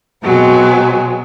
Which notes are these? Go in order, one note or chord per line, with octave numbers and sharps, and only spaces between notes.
B2 F#3 G#3 C4